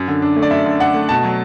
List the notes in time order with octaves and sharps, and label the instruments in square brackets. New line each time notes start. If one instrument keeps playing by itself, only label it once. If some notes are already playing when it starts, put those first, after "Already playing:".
Already playing: [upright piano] F#2
D3
D4
A3
D5
F#2 E5
D3
D4 F#5
A3
B2 A5
F#3